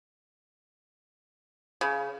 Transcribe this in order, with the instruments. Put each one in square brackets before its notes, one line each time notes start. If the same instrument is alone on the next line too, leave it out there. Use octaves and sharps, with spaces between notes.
[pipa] C#3